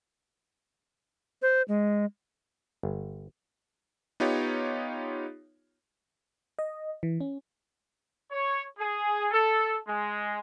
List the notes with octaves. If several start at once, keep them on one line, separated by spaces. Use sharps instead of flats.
C5
G#3
G1
B3 D#4 F4 G4 C#5
D#5
E3
C#4
C#5
G#4
A4
G#3